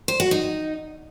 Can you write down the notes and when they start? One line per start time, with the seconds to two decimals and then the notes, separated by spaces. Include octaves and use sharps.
0.08 C5
0.20 F#4
0.31 D#4